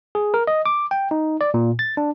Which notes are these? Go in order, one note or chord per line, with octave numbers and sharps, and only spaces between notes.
G#4
A#4
D#5
D6
G5
D#4
D5
A#2
A6
D4